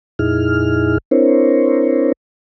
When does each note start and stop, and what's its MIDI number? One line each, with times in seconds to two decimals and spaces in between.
0.19 0.98 41
0.19 0.98 46
0.19 0.98 63
0.19 0.98 64
0.19 0.98 68
0.19 0.98 89
1.11 2.12 60
1.11 2.12 62
1.11 2.12 64
1.11 2.12 70
1.11 2.12 72
1.11 2.12 73